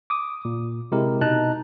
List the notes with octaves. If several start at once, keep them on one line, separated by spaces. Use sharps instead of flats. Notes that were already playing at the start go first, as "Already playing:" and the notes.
D6 D#6
A#2
C3 G#3 E4 G4 A#4
B2 D#4 A5 A#5 F#6